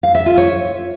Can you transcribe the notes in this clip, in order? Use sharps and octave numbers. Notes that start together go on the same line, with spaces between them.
F5
E5
F4
C#5